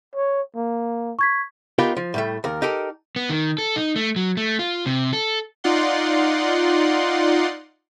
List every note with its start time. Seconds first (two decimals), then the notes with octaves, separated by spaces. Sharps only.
0.16 C#5
0.56 A#3
1.19 C#6 G#6 B6
1.78 B3 D#4 F4 G4 A#4 B4
1.97 F3
2.14 A2 G3 A3
2.44 D#2 A#4
2.62 D#4 G4 A4 A#4
3.16 B3
3.30 D#3
3.58 A4
3.76 D#4
3.96 A3
4.16 F#3
4.37 A3
4.59 F4
4.86 C3
5.13 A4
5.64 D#4 F4 D5 F#5 C6